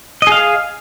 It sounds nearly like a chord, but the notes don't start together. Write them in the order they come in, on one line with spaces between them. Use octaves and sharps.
D#5 G#4 F5